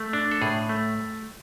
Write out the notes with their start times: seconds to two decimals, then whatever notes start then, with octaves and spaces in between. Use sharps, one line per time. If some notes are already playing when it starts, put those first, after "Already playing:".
Already playing: A3
0.13 D4
0.31 A4
0.42 A2 G#4
0.69 A3